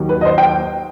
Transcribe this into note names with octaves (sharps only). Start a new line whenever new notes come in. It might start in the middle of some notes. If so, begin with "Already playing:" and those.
Already playing: D#2 D#3 F#3
B4
D#5
C5
G5